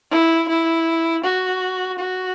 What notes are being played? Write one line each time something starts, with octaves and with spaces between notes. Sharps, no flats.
E4
E4
F#4
F#4